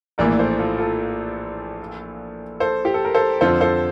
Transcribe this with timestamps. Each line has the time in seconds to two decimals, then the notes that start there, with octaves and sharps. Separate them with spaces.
0.18 A#1 A2 E3 A#3 A#4 D5
0.39 A4 C5
0.59 F4 A4
0.78 F4 A4
2.60 A4 C5
2.85 G4
2.94 A4
3.05 A#4
3.14 A4 C5
3.41 F2 D3 F3 C4 F4 A4 C5
3.60 A4 C5